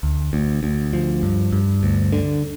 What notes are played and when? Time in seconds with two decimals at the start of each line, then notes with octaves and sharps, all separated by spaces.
0.03 D2
0.33 D2
0.63 D2
0.93 F3
1.23 G2
1.53 G2
1.83 D2
2.12 D3